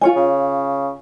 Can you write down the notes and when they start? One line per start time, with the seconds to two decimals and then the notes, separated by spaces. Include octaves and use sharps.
0.01 F4 C#5 G#5
0.16 C#3